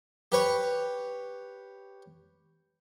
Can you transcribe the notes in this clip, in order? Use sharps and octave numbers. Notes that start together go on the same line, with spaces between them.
G4 B4 C#5